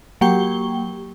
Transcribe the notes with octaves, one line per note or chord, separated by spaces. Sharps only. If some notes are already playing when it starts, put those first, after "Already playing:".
F#3 A#3 G4 G5 C#6 G7